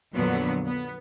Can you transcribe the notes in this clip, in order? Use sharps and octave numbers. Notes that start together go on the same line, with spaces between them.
F2 A#2 D3 F#3 B3
B3